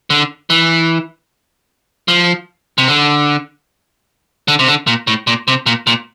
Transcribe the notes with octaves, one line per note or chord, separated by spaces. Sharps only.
D3
E3
F3
C3
D3
D3
C3
D3
A#2
A2
A#2
C3
A#2
A#2